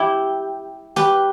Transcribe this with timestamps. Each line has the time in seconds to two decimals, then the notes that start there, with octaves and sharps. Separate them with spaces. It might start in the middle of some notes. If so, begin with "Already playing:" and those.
Already playing: E4 G4
0.96 G4 B4